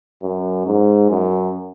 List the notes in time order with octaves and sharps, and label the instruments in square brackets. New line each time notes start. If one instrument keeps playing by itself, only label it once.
[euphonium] F#2
G#2
F#2